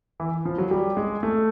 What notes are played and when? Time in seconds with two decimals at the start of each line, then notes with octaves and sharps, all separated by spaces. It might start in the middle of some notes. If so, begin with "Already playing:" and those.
0.20 E3
0.45 F3
0.58 F#3
0.71 G3
0.97 G#3
1.23 A3